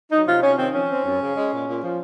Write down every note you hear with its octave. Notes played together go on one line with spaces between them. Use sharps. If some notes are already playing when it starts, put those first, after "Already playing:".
F#3 D#4
C3 F4
C3 C#4
D#3 C4
F3 C#4
C4
F#2
C#3
G#3
A#2
A#2
F3